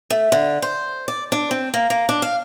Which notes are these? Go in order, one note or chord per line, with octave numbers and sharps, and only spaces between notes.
A3
D3
C5
D5
D4
C4
A#3
A#3
D4
F5